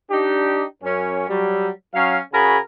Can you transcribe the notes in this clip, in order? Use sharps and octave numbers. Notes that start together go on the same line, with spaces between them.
D4 D#4 G4
F#2 C#4
F#3 G3
F#3 C#4 F5
C#3 F#4 G#4 A#4 G#5 B5